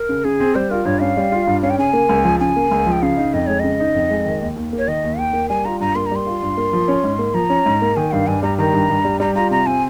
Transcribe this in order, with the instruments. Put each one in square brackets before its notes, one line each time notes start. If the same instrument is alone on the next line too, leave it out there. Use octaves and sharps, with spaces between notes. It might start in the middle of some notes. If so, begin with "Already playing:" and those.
Already playing: [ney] A#4
[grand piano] C#3
[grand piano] C#3 [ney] G#4
[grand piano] C4
[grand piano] G3 [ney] C5
[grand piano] F4 [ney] A#4
[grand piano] G2 [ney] C#5
[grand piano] C#4 [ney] F5
[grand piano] G3
F4
G2
[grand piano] C#4 [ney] F5
[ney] G5
[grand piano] C#3 [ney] G#5
[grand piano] A#3
C#2
F3
[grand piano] C#3 [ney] G#5
[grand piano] A#3
C#2
F3
[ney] G5
[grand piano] C#3 [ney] F5
[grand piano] D#4
[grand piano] F2 [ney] D#5
[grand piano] G#3 [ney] C#5
[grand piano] C#3 [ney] D#5
[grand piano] D#4
F2
G#3
D#3
D#2
D#2
A#3
[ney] C#5
[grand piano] D#3 [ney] D#5
[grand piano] D#2
[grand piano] D#2 [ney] G5
[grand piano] A#3
[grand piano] G3 [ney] G#5
[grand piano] F4 [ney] A#5
[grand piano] G2 [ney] A#5
[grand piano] A#3 [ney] C6
[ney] A#5
[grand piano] G3 [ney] C6
[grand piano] F4
G2
A#3
F3
C#4
G#2
A#3
[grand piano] F3 [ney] A#5
[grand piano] C#4
G#2
A#3
[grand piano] D#3 [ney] G#5
[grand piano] G2 [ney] F5
[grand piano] G2 [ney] G#5
[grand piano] G3 [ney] A#5
[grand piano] D#3 [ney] A#5
[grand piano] G2
G2
G3
[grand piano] G3 [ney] A#5
[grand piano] F4 [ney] A#5
[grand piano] C3 [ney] A#5
[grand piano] C4 [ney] G#5